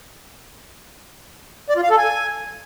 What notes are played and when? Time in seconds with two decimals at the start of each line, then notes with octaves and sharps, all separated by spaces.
1.69 D5
1.76 F4
1.83 F5
1.90 A4
1.97 G#5